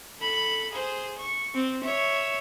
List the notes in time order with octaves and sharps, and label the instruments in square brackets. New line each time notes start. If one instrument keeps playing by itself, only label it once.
[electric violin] A4 B5
G#4 C5
C#6
C4
C#5 E5